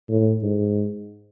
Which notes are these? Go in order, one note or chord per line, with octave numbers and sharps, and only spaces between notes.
A2
G#2